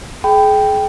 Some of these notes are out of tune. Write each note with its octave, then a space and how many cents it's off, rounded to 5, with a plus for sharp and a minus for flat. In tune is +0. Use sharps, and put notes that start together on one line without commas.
G#4 +35 G5 +0 B5 +25